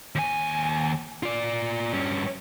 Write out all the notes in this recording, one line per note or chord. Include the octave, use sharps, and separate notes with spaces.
D#2 G#5
F4 D5
G2 C#4